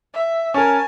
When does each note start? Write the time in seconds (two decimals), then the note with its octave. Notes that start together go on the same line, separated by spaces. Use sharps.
0.14 E5
0.54 C#4 A#4 G#5 A5